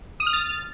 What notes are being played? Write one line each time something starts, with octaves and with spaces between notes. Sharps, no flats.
D#6
F6
A6